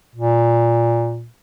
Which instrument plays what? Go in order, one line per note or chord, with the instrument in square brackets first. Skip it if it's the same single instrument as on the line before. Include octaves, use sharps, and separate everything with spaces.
[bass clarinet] A#2